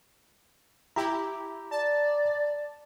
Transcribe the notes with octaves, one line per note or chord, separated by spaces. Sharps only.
E4 G4 A#5
D5 A5